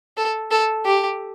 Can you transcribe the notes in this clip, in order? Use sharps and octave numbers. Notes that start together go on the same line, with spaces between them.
A4
A4
G4